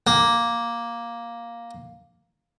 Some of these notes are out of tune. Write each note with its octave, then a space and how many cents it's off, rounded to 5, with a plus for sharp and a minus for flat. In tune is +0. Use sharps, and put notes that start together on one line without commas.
A#3 +5